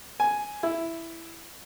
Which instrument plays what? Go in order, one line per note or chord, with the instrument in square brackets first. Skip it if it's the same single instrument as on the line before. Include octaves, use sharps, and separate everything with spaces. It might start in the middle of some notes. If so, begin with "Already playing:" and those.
[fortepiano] G#5
E4